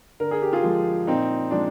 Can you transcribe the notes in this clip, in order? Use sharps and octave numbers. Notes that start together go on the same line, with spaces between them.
D3 A#4
G#4
G4
F4 G#4
F3 G#3
A#2 C4 D#4
F3 G#3 D4